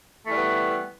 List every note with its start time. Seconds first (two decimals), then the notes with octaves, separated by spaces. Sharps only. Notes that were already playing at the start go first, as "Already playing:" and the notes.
0.24 A3
0.28 E3
0.32 G3
0.36 B3